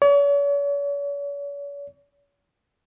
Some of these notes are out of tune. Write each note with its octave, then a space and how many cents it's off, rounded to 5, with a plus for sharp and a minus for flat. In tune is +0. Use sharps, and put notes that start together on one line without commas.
C#5 +45